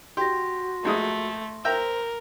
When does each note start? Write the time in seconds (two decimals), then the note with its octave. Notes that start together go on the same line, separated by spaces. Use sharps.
0.17 F#4 G4 C6 A#6
0.85 A#1 G#3 A3 D#6
1.65 A#4 C5 E5 G5 A#5